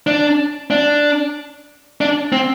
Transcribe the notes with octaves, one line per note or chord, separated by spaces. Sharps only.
D4
D4
D4
C4